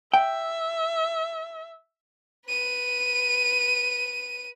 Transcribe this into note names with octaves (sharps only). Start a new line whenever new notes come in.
E5 G5
B4 D#7